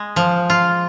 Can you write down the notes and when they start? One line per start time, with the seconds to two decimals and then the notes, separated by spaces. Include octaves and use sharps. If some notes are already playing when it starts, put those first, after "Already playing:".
Already playing: G#3
0.16 F3
0.50 F4